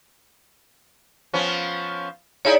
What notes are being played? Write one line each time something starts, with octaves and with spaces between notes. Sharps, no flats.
F3 B3 C#4
D#4 E4 G#4 C#5 D5